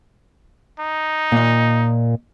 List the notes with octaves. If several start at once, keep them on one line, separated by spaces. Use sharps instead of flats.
D#4
A#2 A#3 D#5